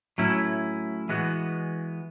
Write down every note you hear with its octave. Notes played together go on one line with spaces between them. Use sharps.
A2 F#3 C#4 E4
E3 G#3 B3 F#4